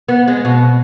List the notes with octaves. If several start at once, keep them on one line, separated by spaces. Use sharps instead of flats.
B3
G#3
B2